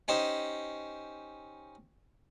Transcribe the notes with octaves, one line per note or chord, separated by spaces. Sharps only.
C#4 D#4 G4 C5